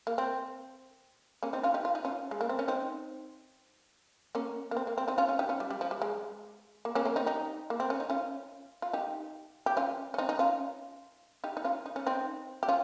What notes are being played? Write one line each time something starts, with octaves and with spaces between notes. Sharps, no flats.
A#3
C4
A#3 C#4
C4 D#4
C#4 F4
D#4 G4
F4
D#4
C#4 F4
G#3
A#3
C4
C#4
C4 D#4
A#3 C#4
A#3
C4
A#3
C4
C4 D#4
C#4 F4
C#4 F4
D#4 G4
C#4 F4
G3
G3
F3
G3
G#3
A#3
A#3 C#4
A#3 C#4
C4 D#4
D#4 G4
A#3
C4
C#4
D#4
C#4 F4
F4
D#4 G4
G4
C#4 F4
C#4
C4 D#4
D#4
C#4 F4
D#4 G4
D#4
C#4 F4
D#4
C#4
C4 D#4
G4
C#4 F4